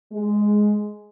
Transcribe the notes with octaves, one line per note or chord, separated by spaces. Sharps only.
G#3